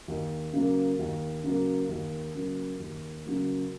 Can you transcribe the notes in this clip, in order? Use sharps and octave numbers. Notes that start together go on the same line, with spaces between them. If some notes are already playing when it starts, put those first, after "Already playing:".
D#2
C#3 F#3 A#3
D#2
C#3 F#3 A#3
D#2
C#3 F#3 A#3
D#2
C#3 F#3 A#3